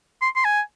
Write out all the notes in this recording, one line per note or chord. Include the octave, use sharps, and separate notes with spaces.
C6
C6
G#5